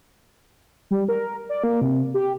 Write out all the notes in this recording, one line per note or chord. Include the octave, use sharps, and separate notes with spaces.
G3
A#4
D5
A#3
C3
G4